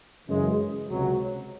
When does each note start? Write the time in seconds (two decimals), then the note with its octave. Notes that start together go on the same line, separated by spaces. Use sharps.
0.27 F#2 C#3 E3 G#3
0.88 C#2 C3 F#3